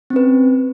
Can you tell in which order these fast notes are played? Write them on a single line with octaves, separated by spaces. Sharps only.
C4 C#4 B4